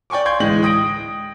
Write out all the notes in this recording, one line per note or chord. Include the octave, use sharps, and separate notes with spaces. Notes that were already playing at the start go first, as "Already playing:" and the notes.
D5 G5 G#5 C#6 D6
F5 G5 C6 G6 G#6
D1 E3 G#3 G6 F#7
G5 D#6 A#6 D7